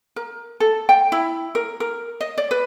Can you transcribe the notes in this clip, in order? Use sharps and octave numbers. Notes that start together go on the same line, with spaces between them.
A#4
A4
G5
E4
A#4
A#4
D#5
D5
B4